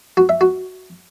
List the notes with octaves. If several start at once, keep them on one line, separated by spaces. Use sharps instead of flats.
F#4
E5
F#4